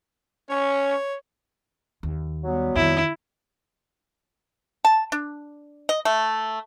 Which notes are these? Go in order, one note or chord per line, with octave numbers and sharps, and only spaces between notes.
C#4 C#5
D#2
F#3 G3 B3
F2 D#3 E4
A5
D4
D#5
A3